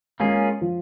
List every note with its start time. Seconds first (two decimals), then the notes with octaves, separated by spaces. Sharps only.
0.20 G#3 A#3 C#4 F4 G#4
0.61 F3